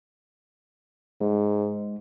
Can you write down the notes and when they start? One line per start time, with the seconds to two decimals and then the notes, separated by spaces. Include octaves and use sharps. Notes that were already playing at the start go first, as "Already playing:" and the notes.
1.21 G#2 G#3